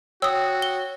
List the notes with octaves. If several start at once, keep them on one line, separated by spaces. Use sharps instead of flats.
F#4 C#5 G5 D#6 E6
G7